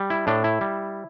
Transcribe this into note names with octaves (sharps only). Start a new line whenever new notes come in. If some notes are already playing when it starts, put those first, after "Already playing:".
Already playing: G3
E4
A2 D4
E4
G3